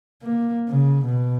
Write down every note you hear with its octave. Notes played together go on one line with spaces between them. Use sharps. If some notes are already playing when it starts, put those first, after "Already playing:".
A#3
C#3
B2